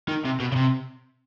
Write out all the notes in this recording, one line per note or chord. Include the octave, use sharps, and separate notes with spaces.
D#3
C3
B2
C#3
C3